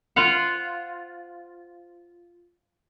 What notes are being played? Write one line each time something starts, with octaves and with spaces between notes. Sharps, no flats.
F4 C5 F5 F#5